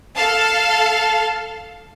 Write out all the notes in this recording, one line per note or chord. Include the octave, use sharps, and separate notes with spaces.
A4 F5 A5